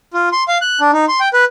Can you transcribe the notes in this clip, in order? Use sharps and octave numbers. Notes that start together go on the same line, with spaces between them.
F4
C6
F5
F#6
D4
D#4
C6
G5
B4